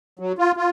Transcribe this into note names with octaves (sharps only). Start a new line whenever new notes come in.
F#3
F4
F4